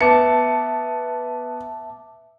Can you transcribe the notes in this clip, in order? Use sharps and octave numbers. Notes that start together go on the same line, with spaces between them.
B3 E5 A5 D6 C#7